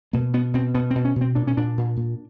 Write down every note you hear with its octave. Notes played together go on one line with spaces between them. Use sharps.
B2 A#3
B2 B3
B2 C4
B2 B3
C4
B2
C#4
B2
C4
A#2 D4
C#4
A#2 D4
A#2
A#2